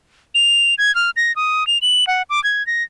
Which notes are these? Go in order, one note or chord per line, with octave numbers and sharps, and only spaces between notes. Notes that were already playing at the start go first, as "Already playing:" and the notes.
F7
G#6
F6
A#6
D#6
F7
F#7
F#5
D6
G#6
A#6